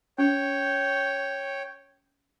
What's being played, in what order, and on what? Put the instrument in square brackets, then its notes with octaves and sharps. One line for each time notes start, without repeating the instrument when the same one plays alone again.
[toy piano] C#4 [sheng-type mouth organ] C#5 G5